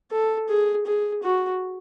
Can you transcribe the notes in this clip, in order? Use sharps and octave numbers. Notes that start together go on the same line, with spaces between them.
A4
G#4
G#4
F#4